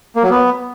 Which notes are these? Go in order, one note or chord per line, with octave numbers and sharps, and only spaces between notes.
A#3
F#3
B3